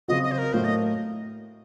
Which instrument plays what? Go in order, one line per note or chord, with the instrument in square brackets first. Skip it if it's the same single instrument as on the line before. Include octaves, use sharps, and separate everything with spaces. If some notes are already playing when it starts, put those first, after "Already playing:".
[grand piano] C#3 F#3 C4 F#4 [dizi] D#5
[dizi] D#5
C5
A#4
[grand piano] A2 F#3 A#3 [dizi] C5
[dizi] D#5